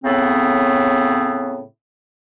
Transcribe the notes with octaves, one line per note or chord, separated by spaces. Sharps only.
A2 C#3 B3 C4